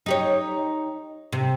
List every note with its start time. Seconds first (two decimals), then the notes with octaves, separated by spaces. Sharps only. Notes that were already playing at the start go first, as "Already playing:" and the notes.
0.06 D#4 G4 C#5
1.33 C3